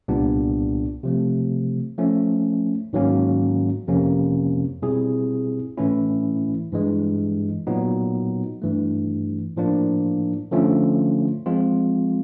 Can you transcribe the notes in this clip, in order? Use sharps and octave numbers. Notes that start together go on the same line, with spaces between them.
C2 A#2 G3 B3 D4
C3 F3 A3
F3 A3 C#4
G#2 D#3 F#3 A#3 C#4
F2 C3 F3 A#3 C#4
B2 G3 C4 E4 G#4
A2 E3 A3 C#4 E4
G2 E3 G#3
A#2 F#3 B3 D#4
G2 E3 A3
A2 F3 A#3 D4
D3 F3 A3 C#4 F4
F3 G#3 C4 F4